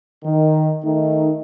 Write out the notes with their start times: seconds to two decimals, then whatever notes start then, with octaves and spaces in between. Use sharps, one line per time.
0.24 D#3
0.84 D#3 A3 D#4